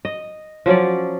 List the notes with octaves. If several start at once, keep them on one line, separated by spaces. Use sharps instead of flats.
D#5
F3 F#3 C#4 D5